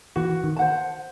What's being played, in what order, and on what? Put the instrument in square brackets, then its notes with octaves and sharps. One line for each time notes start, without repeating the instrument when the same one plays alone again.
[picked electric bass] E3 [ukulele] F#4
[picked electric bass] D#3
[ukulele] C5 F#5 A5